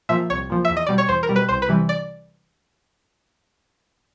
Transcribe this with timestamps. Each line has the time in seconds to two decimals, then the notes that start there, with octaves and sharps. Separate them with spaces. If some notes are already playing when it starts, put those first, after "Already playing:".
0.09 A#2 F3 E5
0.30 C2 C#5
0.50 A#2 F3
0.65 E2 E5
0.77 D#5
0.87 B2 G3 D5
0.98 C#5
1.09 E2 C5
1.23 A#4
1.29 B2 G3
1.36 B4
1.49 C2 C5
1.62 B4
1.69 C3 E3 G3
1.89 D5